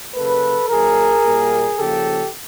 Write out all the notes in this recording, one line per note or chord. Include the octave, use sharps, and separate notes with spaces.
C#3 F#3 A#3 A4 B4
D#3 F#3 A#3 G#4 A#4
A#2 G3 A#3
C#3 F3 A#3 G4 A4